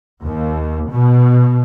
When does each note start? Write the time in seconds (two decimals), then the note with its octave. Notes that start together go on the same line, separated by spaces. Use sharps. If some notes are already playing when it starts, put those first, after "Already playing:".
0.24 D#2
0.89 B2